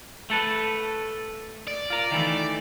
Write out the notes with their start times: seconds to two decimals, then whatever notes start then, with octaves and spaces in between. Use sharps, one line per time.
0.30 A3 A4 B4
1.67 D5
1.90 F4 A#4
2.11 D#3 E3 A3